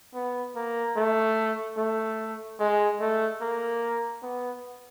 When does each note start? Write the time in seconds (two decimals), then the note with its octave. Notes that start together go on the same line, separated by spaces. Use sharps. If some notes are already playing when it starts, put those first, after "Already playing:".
0.15 B3
0.56 A#3
0.96 A3
1.78 A3
2.60 G#3
3.01 A3
3.41 A#3
4.23 B3